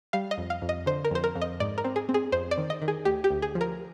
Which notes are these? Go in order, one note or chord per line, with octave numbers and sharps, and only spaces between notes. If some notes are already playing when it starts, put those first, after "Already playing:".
G3 F5
D#5
F2
F5
F2
D#5
D3 C5
A#4
F2 C5
A#4
F2
D#5
G#2 D5
A#4
C4
G#4
C4
G#4
F2 C5
D5
D#3
D#5
D#3
G#4
D2 G4
G4
D2
G#4
F3
A#4